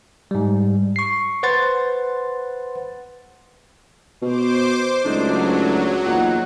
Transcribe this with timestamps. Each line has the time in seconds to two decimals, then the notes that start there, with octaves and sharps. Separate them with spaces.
0.31 G#2 G3
0.96 C#6 C7
1.43 B4 C5 F#5 C6 A6
4.22 B2 C5 D6
5.05 C#2 F#3 A3 D4 D#4
6.06 E2 A#2 D#4 F#5